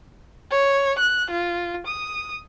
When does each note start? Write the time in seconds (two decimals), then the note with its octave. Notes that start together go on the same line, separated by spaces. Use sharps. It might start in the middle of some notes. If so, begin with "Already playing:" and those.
0.51 C#5
0.98 F#6
1.30 F4
1.86 D#6